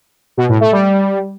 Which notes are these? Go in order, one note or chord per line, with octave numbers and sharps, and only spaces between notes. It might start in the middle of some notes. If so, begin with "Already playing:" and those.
B2
A2
A3
G3